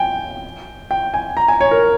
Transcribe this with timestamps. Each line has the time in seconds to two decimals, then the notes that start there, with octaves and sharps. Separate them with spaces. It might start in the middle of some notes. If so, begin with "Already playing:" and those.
Already playing: G5 G#5
0.91 G5
1.14 G#5
1.37 A#5
1.48 G#5
1.61 C#5
1.71 A#4